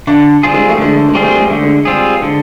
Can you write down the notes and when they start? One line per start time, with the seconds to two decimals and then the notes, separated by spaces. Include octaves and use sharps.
0.07 D3 D4
0.43 G3 C4 F4 G#4
0.54 G#3
0.69 A3
0.78 D3 G#3
0.96 A3
1.09 G#3
1.15 G3 C4 F4 G#4
1.22 A3
1.36 G#3
1.50 D3 A3
1.63 G#3
1.85 G3 C4 F4 G#4
2.21 D3 G#3